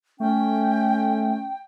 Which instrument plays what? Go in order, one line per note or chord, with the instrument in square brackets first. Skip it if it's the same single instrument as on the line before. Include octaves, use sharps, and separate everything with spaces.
[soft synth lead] A3 [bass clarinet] C#4 [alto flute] G5